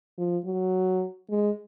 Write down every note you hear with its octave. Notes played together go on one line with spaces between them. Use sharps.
F3
F#3
G#3